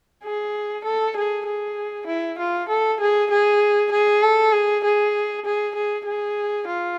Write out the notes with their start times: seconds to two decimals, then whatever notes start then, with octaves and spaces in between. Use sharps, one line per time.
0.24 G#4
0.84 A4
1.16 G#4
1.46 G#4
2.07 E4
2.39 F4
2.69 A4
3.00 G#4
3.31 G#4
3.92 G#4
4.22 A4
4.52 G#4
4.84 G#4
5.45 G#4
5.75 G#4
6.06 G#4
6.67 F4